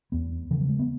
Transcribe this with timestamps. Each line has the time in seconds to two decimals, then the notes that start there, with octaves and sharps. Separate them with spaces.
0.12 E2 B3
0.51 C#3 E3
0.60 F#3
0.69 G#3
0.79 B3